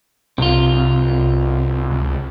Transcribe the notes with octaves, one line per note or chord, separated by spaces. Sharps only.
C2 C3 F4
C#2